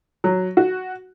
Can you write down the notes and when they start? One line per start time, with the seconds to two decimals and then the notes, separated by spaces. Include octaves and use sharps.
0.24 F#3
0.57 F#4